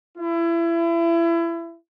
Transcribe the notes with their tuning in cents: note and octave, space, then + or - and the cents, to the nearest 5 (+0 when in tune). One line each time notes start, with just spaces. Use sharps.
E4 +30